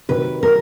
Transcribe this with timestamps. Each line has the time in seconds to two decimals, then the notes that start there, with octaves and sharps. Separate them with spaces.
0.09 C3 D#3 F#3 B4
0.43 A#4